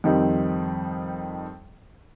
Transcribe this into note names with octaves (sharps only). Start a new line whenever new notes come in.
F2 D#3 G3 C4 D#4